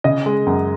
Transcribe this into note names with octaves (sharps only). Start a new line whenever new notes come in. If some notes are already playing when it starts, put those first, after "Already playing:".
C#3 D#5
G#3
F#2